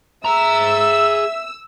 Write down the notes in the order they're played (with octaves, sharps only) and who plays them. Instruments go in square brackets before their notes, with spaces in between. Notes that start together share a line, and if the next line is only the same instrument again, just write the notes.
[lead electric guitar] G#4 A#5 [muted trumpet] E5 [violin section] E6